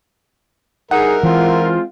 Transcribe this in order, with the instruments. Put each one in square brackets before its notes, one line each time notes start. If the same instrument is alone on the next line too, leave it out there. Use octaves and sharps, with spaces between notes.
[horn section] G2 D#4 G#4 [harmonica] A#4 E5 [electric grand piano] F#5
[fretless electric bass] E3 [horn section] G#3 C4 F4